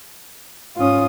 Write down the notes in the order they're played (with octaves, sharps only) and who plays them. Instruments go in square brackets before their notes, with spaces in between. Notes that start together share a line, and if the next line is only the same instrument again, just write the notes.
[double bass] G#2 C#4 [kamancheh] F4 D#6